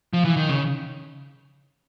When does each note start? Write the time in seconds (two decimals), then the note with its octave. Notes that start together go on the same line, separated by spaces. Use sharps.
0.13 F3
0.25 E3
0.36 D#3
0.49 C#3